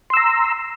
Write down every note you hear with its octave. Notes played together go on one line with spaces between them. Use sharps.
A#5 C6 E6